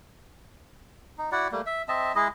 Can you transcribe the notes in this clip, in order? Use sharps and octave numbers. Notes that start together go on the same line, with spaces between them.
D#4
E4 F#4 D5 F#5
G3 A3 A#3
E5
C4 D#5 E5 A5
G#3 E4 G#4 D#5